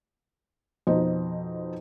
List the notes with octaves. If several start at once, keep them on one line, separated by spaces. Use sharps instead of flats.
F2 B2 D#4 C5